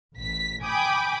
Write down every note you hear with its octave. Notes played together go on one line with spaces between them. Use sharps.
A1 B6
G5 G#5 B5 D6 D#6